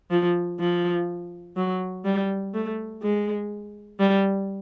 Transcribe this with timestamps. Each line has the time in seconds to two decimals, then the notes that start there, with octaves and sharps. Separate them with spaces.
0.11 F3
0.60 F3
1.57 F#3
2.05 G3
2.54 A3
3.02 G#3
4.00 G3